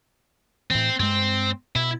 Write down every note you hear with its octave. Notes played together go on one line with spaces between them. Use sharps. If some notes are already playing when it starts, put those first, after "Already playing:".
A2 E3 C4
G2 G#3 C4
B2 E4